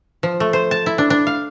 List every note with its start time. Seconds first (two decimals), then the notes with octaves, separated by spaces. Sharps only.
0.23 F3
0.40 A3
0.53 C5
0.71 A5
0.86 E4
0.98 D4
1.10 D4
1.27 F5